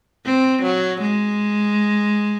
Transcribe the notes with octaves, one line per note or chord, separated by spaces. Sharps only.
C4
F#3
G#3